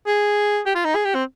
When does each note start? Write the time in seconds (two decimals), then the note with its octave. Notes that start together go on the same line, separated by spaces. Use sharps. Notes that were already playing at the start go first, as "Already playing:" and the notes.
0.07 G#4
0.66 G4
0.75 F4
0.85 D#4
0.95 G#4
1.05 G4
1.15 C4